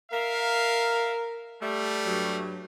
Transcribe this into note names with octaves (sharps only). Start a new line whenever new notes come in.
A#4 E5 F5
G3 A3
G2 F#3